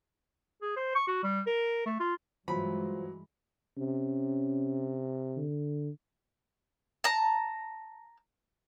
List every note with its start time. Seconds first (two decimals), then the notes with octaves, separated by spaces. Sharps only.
0.62 G#4
0.76 C5
0.95 C#6
1.08 F#4
1.23 G3
1.47 A#4
1.86 A3
2.00 F4
2.48 G2 E3 F#3 G#3 F4 C5 B5
3.78 C3 C#4
5.37 D3
7.04 A5 A#5